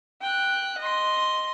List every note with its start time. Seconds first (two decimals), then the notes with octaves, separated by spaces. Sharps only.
0.22 G5 F#6
0.79 D#5 C6